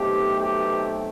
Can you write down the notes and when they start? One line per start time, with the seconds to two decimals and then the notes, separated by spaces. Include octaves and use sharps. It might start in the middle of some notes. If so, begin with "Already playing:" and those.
Already playing: B1 B2 A3 C4 G4
0.40 G4